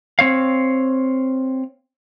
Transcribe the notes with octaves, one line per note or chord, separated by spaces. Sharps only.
C4 C#5 F5